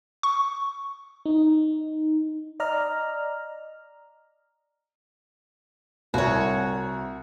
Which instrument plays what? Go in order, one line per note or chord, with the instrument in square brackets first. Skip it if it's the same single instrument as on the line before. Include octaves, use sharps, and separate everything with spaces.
[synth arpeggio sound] C#6
[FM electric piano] D#4
D5 D#5 A#5 F6
[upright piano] C2 [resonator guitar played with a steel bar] F#4 C#5